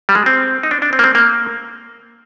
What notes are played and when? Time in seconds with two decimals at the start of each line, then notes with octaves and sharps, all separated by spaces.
0.09 G3
0.15 G#3
0.26 C4
0.63 D#4
0.71 D4
0.82 D4
0.93 C4
0.99 A#3
1.04 C4
1.15 A#3